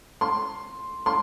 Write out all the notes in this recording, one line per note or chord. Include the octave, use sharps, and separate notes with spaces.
C6
C6